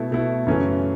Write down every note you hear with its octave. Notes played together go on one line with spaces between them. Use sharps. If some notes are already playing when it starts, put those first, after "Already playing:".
Already playing: B2 A3 E4 A4
B2 A3 E4 A4
F#2 C#3 E3 A3 C#4